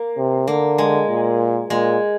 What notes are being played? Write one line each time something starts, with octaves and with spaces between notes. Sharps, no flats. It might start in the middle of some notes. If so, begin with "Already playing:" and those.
Already playing: A#3
C3
D3 A#3
G#3
A#2
A#2 G#3